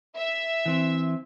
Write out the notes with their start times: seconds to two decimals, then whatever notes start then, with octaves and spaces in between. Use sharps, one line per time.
0.17 E5
0.66 E3 C4